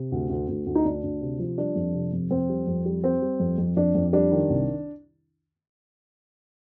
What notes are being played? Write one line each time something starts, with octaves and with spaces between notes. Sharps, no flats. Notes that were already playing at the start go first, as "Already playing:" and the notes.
Already playing: C3
D2
D2
D2
D2
D#4
D2 D4
D2
C3
F3
G3 D4
F2
C3
F2
F2 C4
G3
F2
G3
G3 C4
G3
F2
F2
F2 D4
F2
G3 D4
D#3
C2